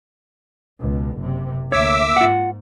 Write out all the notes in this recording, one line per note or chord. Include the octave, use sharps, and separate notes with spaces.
C#2 B2
F#1 C3
D2 A#3 C#5 E5 D6 E6
G#2 F4 F#5